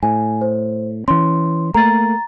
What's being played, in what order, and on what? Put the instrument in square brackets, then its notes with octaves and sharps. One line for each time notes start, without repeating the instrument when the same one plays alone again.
[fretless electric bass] A2 [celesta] G#5
[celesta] C5
[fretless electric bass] E3 C#4 [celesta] C6
[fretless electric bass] A3 A#3 [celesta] A#5 A6